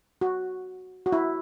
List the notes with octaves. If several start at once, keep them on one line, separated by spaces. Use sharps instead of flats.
F#4
F#4
E4